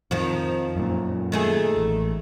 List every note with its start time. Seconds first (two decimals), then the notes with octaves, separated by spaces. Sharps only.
0.11 F2 D#3 F3
0.76 F#2 A#2
1.32 D#3 A3 G#4
1.77 A1